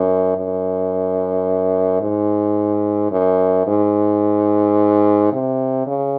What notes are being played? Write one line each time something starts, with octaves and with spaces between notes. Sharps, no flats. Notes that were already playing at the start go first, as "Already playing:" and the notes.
Already playing: F#2
F#2
G#2
F#2
G#2
C3
C#3